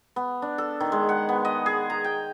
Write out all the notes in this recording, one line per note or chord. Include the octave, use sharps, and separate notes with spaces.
B3
D4
A4
D#3
G#3
F#5
B3
D#5
G#4
A#5
G5